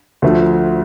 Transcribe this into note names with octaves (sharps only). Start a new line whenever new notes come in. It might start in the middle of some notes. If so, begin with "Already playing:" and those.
D2 D3 F3 A3